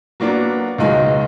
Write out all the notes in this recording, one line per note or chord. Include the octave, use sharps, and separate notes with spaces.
F#3 A#3 B3 D4
C#2 B2 D#3 F#3 G#3